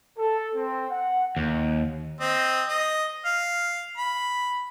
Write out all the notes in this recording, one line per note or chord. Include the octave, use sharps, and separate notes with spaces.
A4
C4
F#5
D#2
C4 D#5
D#5
F5
B5